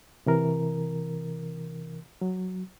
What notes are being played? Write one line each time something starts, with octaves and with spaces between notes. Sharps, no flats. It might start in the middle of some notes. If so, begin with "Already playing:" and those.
C3 E3 A#4
F#3